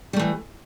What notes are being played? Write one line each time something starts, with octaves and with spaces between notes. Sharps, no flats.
E3 G3 A3